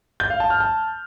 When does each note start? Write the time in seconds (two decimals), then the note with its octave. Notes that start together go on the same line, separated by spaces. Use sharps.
0.20 G6
0.30 F5
0.40 A5
0.50 F6
0.60 A5